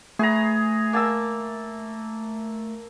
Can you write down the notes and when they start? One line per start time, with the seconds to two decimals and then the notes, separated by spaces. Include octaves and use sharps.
0.19 A3 G#4 B4 A#5
0.93 A#3 A5 E6